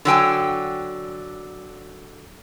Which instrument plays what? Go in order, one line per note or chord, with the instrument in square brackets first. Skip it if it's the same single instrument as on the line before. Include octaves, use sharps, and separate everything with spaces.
[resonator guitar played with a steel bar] D3 F#3 G5 G#5